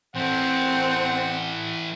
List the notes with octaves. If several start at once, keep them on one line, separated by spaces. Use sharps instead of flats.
E3 C4 A4 F#5